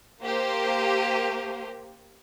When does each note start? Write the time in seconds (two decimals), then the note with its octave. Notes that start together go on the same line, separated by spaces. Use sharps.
0.23 A#3 G4 C5